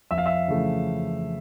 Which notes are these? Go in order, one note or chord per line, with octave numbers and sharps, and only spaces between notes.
F2 E5
F5
E5
C#3 E3 A3